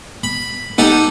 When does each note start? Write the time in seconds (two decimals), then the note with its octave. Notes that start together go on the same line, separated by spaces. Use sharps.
0.23 B5
0.78 D#4 G4 A4 F#5